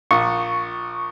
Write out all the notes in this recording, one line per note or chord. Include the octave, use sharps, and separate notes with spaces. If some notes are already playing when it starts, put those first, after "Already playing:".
A#1 C#6